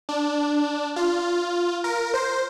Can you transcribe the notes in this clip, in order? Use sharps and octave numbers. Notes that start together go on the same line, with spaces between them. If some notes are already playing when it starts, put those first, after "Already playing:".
D4
F4
A#4
C5